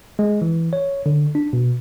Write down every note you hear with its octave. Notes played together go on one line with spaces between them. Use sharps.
G#3
E3
C#5
D3
D4
B2